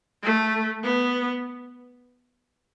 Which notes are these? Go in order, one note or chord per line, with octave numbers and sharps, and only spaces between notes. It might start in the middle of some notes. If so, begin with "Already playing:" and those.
A3
B3